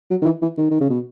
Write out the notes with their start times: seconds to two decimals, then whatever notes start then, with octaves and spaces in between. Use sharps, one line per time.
0.10 F#3
0.22 D#3
0.25 E3
0.42 E3
0.58 D#3
0.71 D#3
0.81 C#3
0.90 B2